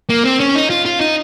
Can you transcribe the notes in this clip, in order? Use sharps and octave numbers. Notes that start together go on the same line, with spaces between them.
A#3
C4
C#4
D#4
F4
F4
D#4